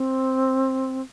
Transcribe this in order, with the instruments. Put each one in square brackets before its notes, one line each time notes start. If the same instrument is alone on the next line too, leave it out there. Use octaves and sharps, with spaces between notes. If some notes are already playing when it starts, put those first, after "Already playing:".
Already playing: [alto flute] C4